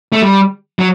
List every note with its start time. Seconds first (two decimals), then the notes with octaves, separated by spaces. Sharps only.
0.12 A3
0.22 G3
0.79 F#3